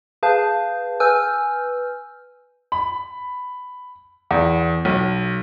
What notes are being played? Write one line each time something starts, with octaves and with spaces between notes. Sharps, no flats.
G#4 B4 F5 A5 G6
B4 G#5 E6 F6 G6
B5
E2
B1